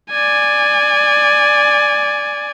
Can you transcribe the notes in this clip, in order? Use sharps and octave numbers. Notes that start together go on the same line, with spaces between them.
D5 G#5